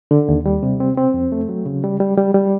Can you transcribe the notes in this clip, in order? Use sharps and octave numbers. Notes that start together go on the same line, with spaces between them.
D3
D#2
G3
C3
C4
C4
F2
A3
F#3
C#3
G3
G3
G3
G3